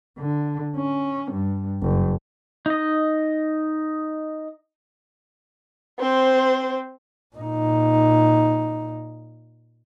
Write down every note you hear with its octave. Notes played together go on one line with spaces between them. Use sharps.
D3
C#4
G2
F#1
D#4 D#5
C4 C5
A#2 D#4